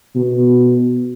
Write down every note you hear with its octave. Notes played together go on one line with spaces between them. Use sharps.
B2